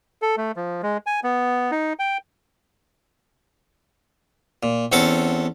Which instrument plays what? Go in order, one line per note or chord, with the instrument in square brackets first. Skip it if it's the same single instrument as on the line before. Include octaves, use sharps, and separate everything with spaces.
[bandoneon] A4
A3
F3
G#3
G#5
B3
D#4
G5
[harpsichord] A#2
E2 C4 C#4 A4 F#5 D6